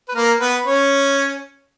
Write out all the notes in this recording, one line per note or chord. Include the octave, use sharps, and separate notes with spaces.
B4
A#3 A#4
B3 B4
C#4 C#5